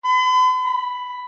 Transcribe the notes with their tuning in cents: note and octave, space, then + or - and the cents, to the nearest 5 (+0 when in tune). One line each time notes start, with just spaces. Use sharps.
B5 +45
B5 +5